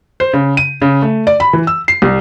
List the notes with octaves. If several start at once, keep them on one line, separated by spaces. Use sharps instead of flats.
C5
C#3
D#7
C#3
A3
D5
B5
E3
E6
C7
C2